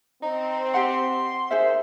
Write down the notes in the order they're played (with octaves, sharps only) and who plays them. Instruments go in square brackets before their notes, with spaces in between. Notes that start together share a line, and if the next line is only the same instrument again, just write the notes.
[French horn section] C4 [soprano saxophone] D#4
[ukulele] G4 C5 F#5 [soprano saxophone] C6
[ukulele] D#4 G#4 E5 [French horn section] A#4 C5